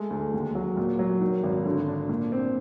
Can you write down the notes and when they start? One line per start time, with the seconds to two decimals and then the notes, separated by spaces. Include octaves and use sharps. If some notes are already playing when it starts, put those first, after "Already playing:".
Already playing: G#3 A3
0.10 D2
0.34 D#2
0.55 F#3
0.77 A#2
0.99 F#3
1.21 D#3
1.44 G#1
1.65 D3
1.88 D4
2.09 A#2
2.32 C4